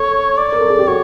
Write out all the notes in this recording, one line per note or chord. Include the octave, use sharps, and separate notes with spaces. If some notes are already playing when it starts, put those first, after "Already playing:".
Already playing: A4 C#5
D5
A#4
A4
G#4
G4
F#4 C#5